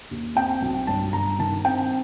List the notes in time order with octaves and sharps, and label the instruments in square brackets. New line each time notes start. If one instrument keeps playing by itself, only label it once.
[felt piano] D#2
C4 G5
B1
G1 A5
G1 A#5
D#3 A5
C4 G5